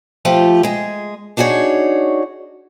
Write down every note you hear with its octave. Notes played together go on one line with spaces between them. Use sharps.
F3 A3 F4 G4
G#3 G#4
D4 D#4 F#4 G#4 C#5